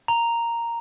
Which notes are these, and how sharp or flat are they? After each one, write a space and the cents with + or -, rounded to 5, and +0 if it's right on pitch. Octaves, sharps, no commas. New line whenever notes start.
A#5 -5